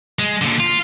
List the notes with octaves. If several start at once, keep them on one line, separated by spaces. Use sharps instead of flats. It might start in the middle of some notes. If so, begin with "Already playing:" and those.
G#3
A#2 D3
F4